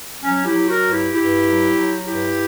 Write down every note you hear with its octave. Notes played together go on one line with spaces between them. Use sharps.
F#3 C#4
E4 G4
F#3
F#4 A#4
G2
E4 G4
G2 E4 G4
F#3
F#3
G2 E4 G4